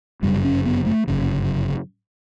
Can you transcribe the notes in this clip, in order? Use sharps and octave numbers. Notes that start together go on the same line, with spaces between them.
G1 F#2 C#3 G3
C#4
B3
A3
G1 F#2 C#3